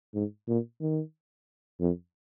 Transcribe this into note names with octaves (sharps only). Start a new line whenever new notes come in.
G#2
A#2
D#3
F2